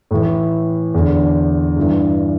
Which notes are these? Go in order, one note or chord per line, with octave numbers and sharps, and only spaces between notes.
A2 E3
E2 D3
G2 E3